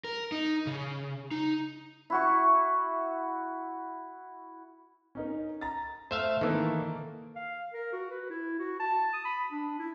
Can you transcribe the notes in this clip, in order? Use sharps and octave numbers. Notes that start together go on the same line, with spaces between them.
A#4
D#4
C#3
D#4
E4 F#4 C#6
C#4 D#4 A#4
A#5 A6
A3 C5 E5 F5
D#3 E3 A#3 A4 B4
F5
A#4
F#4
B4
E4
F#4
A5
D#6
B5
D4
E4